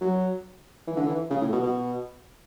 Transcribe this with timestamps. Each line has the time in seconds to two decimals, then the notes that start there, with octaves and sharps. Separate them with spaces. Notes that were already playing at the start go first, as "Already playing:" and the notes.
0.01 F#3
0.87 E3
0.97 D3
1.07 E3
1.30 C#3
1.41 A2
1.53 B2
1.63 B2